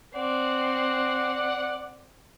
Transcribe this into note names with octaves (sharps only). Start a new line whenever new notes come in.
C4 D5 F#5